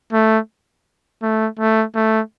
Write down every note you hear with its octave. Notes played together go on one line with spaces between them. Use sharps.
A3
A3
A3
A3